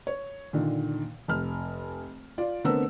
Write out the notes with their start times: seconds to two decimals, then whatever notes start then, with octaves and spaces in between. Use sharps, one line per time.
0.07 C#5
0.53 A#2 D3 D#3
1.28 F1 F6
2.38 F4 D5
2.64 D3 A3 B3 C4 A#4 E6